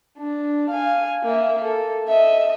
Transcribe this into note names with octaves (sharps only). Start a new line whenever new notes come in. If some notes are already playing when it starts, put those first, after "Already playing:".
D4
F5 G#5
A#3 E5
A4
D#5 E5